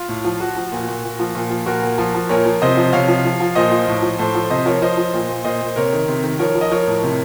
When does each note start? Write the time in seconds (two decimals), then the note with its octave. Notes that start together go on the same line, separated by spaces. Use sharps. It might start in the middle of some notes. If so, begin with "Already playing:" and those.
Already playing: F4
0.08 A2
0.24 F3
0.40 F3 F#4
0.57 F3
0.72 A#2
0.88 A#2
1.04 A#2
1.19 F3
1.35 A#2
1.50 F3
1.66 A#2 F#4 A#4
1.82 A#2
1.98 F3
2.15 F3
2.29 A#2 A#4 C#5
2.45 F3
2.62 C3 C5 D#5
2.77 F3
2.93 C3 C#5 F5
3.08 F3
3.25 F3
3.40 F3
3.55 A#2 C5 D#5
3.72 F3
3.88 A2
4.03 F3
4.18 A2 A4 C5
4.35 F3
4.50 C3 C5 D#5
4.66 F3 A#4 C#5
4.82 F3 C5 D#5
4.97 F3
5.13 A#2
5.29 A#2
5.44 A#2 C5 D#5
5.61 A#2
5.76 C3 A#4 C#5
5.93 D#3
6.08 C3
6.24 D#3
6.39 F3 A#4 C#5
6.55 F3
6.61 D#5
6.71 F3 A#4 C#5
6.87 A2
7.03 C3